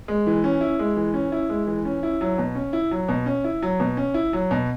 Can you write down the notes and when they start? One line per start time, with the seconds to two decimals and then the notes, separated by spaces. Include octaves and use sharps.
0.08 G#3
0.27 E3
0.44 C#4
0.61 E4
0.79 G#3
0.97 E3
1.14 C#4
1.32 E4
1.49 G#3
1.67 E3
1.85 C#4
2.03 E4
2.21 F#3
2.38 B2
2.55 C#4
2.73 E4
2.91 F#3
3.08 B2
3.26 C#4
3.44 E4
3.62 F#3
3.80 B2
3.97 C#4
4.14 E4
4.33 F#3
4.51 B2